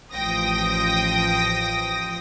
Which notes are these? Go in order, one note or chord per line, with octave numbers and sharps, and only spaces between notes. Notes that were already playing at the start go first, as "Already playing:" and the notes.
A1 F3 G5 D#6 A#6